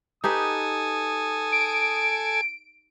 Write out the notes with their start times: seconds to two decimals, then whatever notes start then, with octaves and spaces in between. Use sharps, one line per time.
0.24 D#4 G4 A4 B4 G#5 D#6
1.52 D7